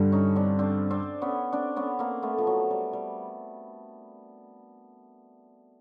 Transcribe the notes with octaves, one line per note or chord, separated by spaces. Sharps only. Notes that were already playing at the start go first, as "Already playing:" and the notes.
Already playing: G2 D3 G3
C#4 D#4
C4 D4
C4 D4
C4 D4
B3 C#4
C4 D4
B3 C#4
A#3 C4
A3 B3
F3
F#3
G3
G3